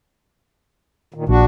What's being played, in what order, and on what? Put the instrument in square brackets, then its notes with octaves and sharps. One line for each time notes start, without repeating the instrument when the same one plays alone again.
[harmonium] A#2 D#3
[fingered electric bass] A#1 [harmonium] D4 F#4